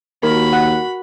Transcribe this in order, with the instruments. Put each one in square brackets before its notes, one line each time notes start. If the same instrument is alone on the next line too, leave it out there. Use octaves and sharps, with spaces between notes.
[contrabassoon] D#2 [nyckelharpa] F#4 B5 [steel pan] A#4
[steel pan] F#5